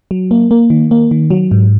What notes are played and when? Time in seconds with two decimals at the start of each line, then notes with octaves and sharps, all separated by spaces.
0.11 F#3
0.31 A#3
0.51 A#3
0.70 D#3
0.91 A#3
1.11 D#3
1.31 F#3
1.51 G#2